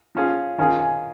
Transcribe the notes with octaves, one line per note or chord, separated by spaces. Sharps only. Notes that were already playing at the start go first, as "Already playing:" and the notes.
F3 C#4 F4 G#4
D#3 C#4 F4 G#4 G#5
G#5